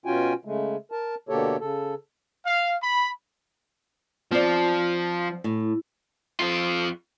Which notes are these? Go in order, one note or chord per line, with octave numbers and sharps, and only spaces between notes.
B2 C#4 F4 F#4 G5 G#5
C#3 G#3 A3
A#4 A5
B2 D3 A#3 G4 A4 C#5
C#3 A4
F5
B5
F3 C4 D5
A2
F2 F4